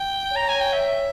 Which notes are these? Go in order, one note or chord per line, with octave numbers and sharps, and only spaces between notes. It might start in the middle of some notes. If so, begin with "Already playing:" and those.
Already playing: G5
C#5 A#5
G#5
G5
E5